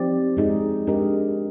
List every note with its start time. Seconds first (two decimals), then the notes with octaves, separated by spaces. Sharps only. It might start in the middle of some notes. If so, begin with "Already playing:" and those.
Already playing: F3 C4 D#4 G4 D5
0.37 G#3 D#4 G#4
0.87 G#3 D4 G4 A#4 D#5